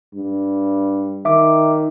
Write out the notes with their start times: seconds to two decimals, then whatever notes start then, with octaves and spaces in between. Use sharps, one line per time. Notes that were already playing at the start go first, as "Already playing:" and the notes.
0.15 G2
1.25 D#3 E5 D6